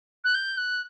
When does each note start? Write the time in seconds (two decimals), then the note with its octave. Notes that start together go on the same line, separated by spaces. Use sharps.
0.24 F#6
0.35 G6
0.57 F#6